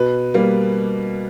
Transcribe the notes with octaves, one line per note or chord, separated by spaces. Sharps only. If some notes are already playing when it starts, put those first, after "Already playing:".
Already playing: B2 B4
G3 A#3